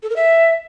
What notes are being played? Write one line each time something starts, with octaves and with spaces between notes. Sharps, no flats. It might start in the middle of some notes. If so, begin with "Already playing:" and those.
A4
A#4
E5